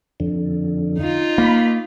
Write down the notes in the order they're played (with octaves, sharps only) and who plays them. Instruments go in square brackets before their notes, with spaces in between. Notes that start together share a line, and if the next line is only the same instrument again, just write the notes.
[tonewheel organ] F2 D3
[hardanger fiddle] D#4 F4
[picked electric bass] A#3 [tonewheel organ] B5